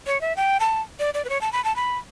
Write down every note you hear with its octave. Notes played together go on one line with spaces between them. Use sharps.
C#5
E5
G5
A5
D5
D5
B4
C#5
A5
B5
A5
B5